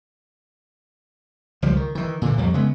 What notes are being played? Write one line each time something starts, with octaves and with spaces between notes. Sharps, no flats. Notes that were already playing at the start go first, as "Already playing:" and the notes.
C#2 F3 G3
D#3
D#3 E3
A#2 D3 E3
F2 F#3 G3
C#3 G#3 A3 B3